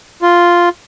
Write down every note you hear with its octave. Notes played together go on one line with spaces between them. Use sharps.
F4